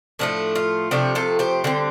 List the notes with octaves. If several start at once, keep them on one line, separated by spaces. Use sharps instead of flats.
A2 F3 A3 D4
F4
C3 F3 A3 D4 G4
F4 A4
G4 C5
D3 G3 C4